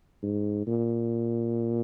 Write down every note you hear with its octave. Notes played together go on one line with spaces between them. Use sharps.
G#2
A#2